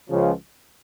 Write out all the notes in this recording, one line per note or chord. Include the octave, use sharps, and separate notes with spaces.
C#2 C#3 F3